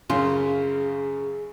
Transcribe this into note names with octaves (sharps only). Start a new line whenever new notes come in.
F#2 C#3 F4 G#4